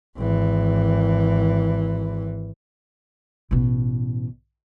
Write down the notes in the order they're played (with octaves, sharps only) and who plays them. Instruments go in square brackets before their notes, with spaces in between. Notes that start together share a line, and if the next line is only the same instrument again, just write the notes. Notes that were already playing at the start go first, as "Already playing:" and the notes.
[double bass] G#1 E3
[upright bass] A1 B2